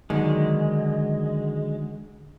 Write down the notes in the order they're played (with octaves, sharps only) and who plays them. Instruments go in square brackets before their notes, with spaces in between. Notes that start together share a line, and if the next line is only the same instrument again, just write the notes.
[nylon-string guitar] D3 F#3 B3 [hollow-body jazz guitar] D#3 [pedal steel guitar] G#3